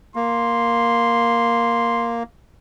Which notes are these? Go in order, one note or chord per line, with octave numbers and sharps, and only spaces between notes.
A#3 C6